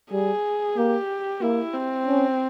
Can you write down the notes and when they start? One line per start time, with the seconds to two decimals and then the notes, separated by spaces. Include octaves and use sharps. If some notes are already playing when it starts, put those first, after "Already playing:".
0.11 G3 G#4
0.77 A#3 G4
1.41 A#3 E4
1.74 C4
2.07 C#4